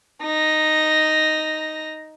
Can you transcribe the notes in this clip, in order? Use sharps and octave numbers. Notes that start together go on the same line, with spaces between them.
D#4 A#6